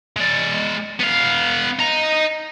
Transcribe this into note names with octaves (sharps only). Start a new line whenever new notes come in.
G#3 D5
B3 F5
D#5 A#5